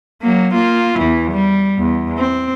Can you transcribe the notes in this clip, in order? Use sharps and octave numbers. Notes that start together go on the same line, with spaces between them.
F#3 A#3
A#3 F4
E2 E3
G3
E2
C4